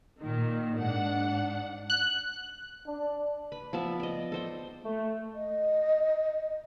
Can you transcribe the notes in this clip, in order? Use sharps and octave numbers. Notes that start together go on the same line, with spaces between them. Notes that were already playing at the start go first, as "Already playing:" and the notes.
A#2 D#3
G#2 D4 F#5
F#6
D4
B4 B5
F3 B3 D5 E5
D5 D#5
A4 C5 G5
A3
D#5